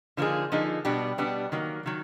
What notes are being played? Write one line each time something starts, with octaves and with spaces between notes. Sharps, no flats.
D3 F3 A#3 D#4 G#4
D3 F3 A#3 D#4 G#4
B2 G3 B3 D4 G4
B2 G3 B3 D4 G4
D#3 F#3 A#3
D#3 F#3